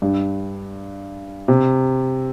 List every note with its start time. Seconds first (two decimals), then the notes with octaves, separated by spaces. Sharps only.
0.02 G2
1.48 C3